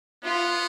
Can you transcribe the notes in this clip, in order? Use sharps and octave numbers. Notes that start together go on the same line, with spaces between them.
B3 F4